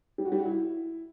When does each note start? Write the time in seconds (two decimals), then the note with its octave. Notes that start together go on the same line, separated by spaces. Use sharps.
0.18 G3
0.25 F#4
0.32 G3
0.39 F#4
0.45 E4